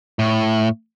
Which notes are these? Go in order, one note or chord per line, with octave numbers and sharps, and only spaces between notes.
A2